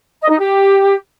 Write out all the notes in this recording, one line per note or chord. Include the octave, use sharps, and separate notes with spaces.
D#5
D#4
G4